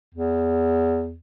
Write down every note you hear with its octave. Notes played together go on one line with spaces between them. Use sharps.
E2